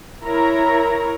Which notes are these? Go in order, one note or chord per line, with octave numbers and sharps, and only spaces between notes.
E4 A#4 C#5 A#5